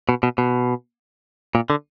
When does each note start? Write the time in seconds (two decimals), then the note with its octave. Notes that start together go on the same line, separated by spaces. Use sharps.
0.09 B2
0.23 B2
0.38 B2
1.55 A#2
1.70 D3